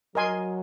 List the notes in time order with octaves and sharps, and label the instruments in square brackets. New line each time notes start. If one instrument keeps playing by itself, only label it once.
[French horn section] F#3 [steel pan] A#4 D#5 G#5 C6